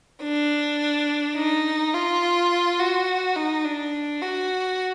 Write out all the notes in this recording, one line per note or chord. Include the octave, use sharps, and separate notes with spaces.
D4
D#4
F4
F#4
D#4
D4
F#4